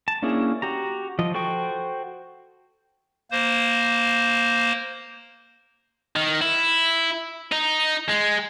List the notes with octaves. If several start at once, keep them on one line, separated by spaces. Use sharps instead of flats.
A5
A#3 C#4 D4 E4 G#4
F#4 G4 A#5
F3 D#5
F#4 A4 C5 G5 C#6
A#3 C5
D#3
E4
D#4
G#3